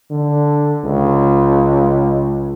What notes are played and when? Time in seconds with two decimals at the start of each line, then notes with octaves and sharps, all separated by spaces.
0.10 D3
0.84 C#2